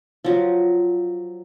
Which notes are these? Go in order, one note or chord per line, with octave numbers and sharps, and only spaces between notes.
F3 F#3